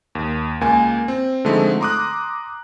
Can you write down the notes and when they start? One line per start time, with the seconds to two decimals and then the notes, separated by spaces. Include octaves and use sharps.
0.15 D#2
0.61 C#2 A#3 G#5
1.08 C4
1.45 D3 F3 G#3 A3 C4 D#4
1.81 A#5 C6 D6 D#6 F#6